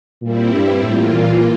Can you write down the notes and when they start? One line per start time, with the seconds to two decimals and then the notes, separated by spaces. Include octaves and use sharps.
0.22 A#2 G3 C4 E4
0.53 G2
0.83 A2 E3 A#3 F4
1.13 A#2